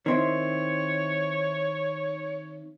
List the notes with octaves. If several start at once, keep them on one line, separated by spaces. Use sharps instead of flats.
D#3 C4 E4 C#5